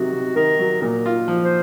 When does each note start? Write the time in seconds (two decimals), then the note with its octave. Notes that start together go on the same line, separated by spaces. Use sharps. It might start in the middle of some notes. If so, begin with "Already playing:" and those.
Already playing: C3 D#3 F#3 F#4
0.13 C3
0.36 D#3 A#4
0.59 F#3
0.82 A#2 A#4
1.06 F4
1.28 F3
1.44 C5